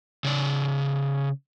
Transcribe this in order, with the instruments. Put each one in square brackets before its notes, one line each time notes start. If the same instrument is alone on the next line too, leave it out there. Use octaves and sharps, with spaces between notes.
[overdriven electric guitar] C#3 D5